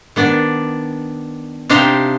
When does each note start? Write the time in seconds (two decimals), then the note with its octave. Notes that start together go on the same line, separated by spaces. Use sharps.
0.16 D#3 B3 D4 D5
1.69 C3 D4 D#4 G4 C5 F5